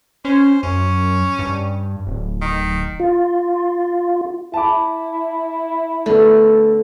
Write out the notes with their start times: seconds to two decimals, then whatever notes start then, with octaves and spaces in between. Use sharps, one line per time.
0.25 C#4 C5
0.63 F#2 C#4
1.39 G2
2.07 D1
2.42 D#3
3.00 F4
4.54 E4 A5 B5 D6
6.06 D3 A3 B3 A4